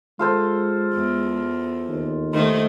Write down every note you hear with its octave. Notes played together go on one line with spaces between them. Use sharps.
G#3 F4 A4 C5
E2
D#2
D#3 A3 C5